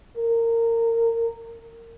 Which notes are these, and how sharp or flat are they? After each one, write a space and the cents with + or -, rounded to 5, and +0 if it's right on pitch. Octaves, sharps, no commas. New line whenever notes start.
A#4 -20